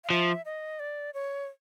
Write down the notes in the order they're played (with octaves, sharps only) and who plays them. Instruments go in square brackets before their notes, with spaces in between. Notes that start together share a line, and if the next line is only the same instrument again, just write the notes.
[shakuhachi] F5
[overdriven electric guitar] F3 [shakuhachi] E5
[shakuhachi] D#5
D5
C#5